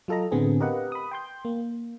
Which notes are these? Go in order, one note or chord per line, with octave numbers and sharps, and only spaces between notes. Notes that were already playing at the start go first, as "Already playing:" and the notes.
F#3 F4 A4 D#5 A#5
A2 D3 B3 C4 G#4
G4 A#4 B4 D#5 F5 F#5
B5 D#6
G5 C6 G6
A#3